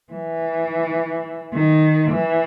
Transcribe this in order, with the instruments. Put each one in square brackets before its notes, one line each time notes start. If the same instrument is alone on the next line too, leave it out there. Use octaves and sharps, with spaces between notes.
[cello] E3
D#3
E3